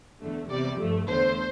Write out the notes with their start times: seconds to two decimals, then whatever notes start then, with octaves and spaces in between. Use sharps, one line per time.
0.20 E2 D3 A3
0.49 E2 C3 G3 D5
0.79 G2 F3 A3
1.08 E2 D3 A3 C5